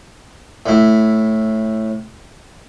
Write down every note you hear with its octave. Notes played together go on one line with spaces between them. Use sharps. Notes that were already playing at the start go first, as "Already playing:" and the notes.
A2 E4